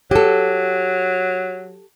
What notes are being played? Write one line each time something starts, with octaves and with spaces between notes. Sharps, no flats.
F#3 G4 A4